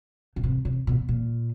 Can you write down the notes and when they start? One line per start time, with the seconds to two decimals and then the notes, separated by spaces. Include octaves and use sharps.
0.36 C#3
0.43 C3
0.65 C3
0.87 B2
1.09 A#2